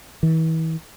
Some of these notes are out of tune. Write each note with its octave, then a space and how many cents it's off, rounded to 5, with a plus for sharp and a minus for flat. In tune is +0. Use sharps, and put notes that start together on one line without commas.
E3 -40